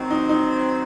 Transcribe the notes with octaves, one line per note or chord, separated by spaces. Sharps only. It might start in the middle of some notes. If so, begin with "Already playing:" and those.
Already playing: D#3 F#3 C4
D#4
D#4